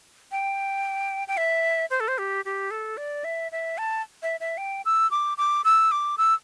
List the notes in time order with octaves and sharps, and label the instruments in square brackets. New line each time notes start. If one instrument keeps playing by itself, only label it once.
[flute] G5
G5
E5
C5
A4
C5
G4
G4
A4
D5
E5
E5
A5
E5
E5
G5
E6
D6
D6
E6
D6
E6